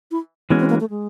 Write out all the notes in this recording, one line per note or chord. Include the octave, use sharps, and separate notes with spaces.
E4
E3 G#3 B3 C#4 F#4
C4
A#3
A3
G#3